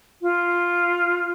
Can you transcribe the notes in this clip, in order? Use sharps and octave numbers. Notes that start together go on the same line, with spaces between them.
F4